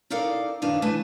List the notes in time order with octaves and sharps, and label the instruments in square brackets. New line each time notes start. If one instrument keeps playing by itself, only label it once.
[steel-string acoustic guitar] D#4 A4 A#4 D5 F5
F#2 D#3 D4 D#4 B4 F5
D3 E3 A3 B4 G#5 A5